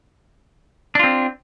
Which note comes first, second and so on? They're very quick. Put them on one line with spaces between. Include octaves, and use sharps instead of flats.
D4 F4 C4